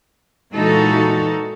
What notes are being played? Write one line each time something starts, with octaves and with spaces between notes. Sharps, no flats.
A#2 E3 G#3 D#4 F#4 A4